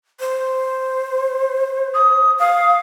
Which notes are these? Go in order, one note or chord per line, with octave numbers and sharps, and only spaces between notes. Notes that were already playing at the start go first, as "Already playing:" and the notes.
C5
D#6
F5 D#6